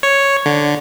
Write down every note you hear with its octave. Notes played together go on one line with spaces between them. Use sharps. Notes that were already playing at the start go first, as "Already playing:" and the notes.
C#5
D3